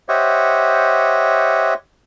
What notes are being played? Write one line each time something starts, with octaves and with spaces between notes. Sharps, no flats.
G4 C5 C#5 D#5 E5 F#5